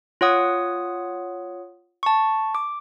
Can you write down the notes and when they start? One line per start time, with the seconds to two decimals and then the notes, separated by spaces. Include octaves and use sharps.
0.21 F4 C#5 F#5 D#6
2.03 A5 C#6
2.55 D6